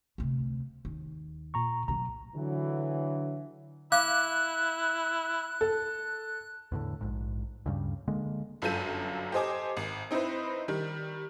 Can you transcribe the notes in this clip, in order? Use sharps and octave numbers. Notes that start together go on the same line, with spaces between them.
D2 C3
D#2
A#2 A#5 C#6
B2 F#3 A#5
D3 E3 F#3
E4 F5 D6 F#6
A4
E2 A2 D3
A#1 G#2
D2 G2 C#3 G3
D3 G#3 A#3
G1 F#2 F4 A4 G6 D#7
G4 A4 C5 D#5 G#5 D6
G#1
C4 D#4 E4 B4 C5
D#3 G3